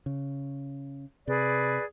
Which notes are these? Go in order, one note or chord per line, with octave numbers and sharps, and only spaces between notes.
C#3
C3 G#4 B4 D5